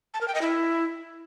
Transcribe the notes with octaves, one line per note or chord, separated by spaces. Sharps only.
A5
A#4
G5
D#5
E4